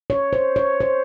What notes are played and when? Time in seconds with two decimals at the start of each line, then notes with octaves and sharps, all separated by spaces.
0.10 C#5
0.33 C5
0.56 C#5
0.81 C5